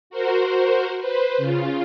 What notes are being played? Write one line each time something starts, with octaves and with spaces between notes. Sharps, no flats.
F#4 A#4 C5
B4 C5
C#3 F4